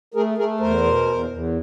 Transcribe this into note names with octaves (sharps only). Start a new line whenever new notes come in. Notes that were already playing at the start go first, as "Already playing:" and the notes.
A3 G#4 A#4
A3 G#4 A#4
E2 A#4 C5
B2
E2
E2